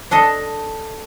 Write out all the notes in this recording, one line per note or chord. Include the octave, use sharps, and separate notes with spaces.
D4 A4 D#5